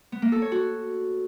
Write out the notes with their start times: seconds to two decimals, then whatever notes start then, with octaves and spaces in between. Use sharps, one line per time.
0.12 B3
0.22 A#3
0.32 A4
0.42 C#5
0.52 F#4